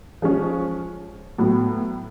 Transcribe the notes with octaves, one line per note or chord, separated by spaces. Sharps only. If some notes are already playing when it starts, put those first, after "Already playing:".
F3 G#3 C#4
A2 F#3 B3